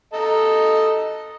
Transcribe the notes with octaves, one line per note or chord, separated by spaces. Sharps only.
A4 D#5 A#5